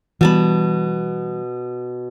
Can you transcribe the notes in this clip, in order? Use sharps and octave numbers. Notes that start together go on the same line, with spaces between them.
B2 E3 G3 A5 B5